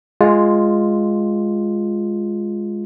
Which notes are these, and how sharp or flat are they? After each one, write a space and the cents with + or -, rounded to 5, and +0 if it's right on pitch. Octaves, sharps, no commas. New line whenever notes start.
G#3 +0 F4 +0